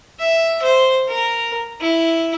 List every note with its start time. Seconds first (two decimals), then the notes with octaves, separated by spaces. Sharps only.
0.19 E5
0.62 C5
1.08 A#4
1.81 E4